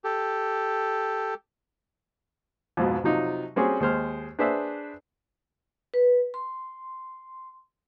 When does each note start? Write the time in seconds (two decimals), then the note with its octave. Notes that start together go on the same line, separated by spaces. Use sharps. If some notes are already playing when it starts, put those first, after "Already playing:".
0.04 G4 A4
2.77 F2 G#2 B2
3.04 C3 F3 F#3 D#4
3.56 G3 C4 C#4 F#4 G#4
3.80 D#2 G#3 C5 F6
4.39 D4 G#4 B4 C5 D5 E5
5.94 B4
6.34 C6